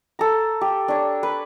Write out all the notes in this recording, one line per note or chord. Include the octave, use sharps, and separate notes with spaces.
A4 A#5
G4
D4 C#5
B4